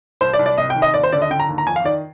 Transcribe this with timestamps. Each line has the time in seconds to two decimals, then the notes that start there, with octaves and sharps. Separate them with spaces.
0.21 C2 C5
0.33 D5
0.39 C2
0.46 D5
0.58 C3 D#5
0.70 G5
0.76 D#3
0.82 D#5
0.94 D#2 D5
1.03 C5
1.12 D3 D5
1.22 D#5
1.30 D3 G5
1.40 A#5
1.49 D#2
1.58 A#5
1.67 F2 G#5
1.76 F5
1.85 D#3 D5